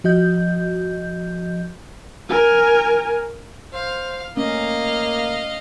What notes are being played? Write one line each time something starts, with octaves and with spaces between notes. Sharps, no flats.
F3 F#4 D#5 G6
A#4 G#5
C5 F5
A3 A#3 C#4 D#5 F5